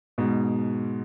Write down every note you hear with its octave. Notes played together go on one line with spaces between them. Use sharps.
G#2 B2